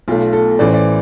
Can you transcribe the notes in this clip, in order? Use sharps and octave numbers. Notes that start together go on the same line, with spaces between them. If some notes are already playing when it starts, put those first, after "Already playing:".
B1 B2 A3 F4
A4
A1 A2 E3 D5
C5
D5